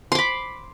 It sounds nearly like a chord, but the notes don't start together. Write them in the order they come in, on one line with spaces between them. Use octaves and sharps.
C6 D6 B5